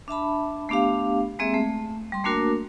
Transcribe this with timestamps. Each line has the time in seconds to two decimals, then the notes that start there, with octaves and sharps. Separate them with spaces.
0.08 D4 E5 A5 B5
0.69 A3 B3 D4 G4 F5
1.39 G#3 A#3 C4 G#4 E5
1.54 A3
2.12 G3 C6
2.24 A3 A#3 D4 F#4 A#4